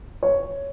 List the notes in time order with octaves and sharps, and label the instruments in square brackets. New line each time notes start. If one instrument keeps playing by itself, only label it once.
[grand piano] C#5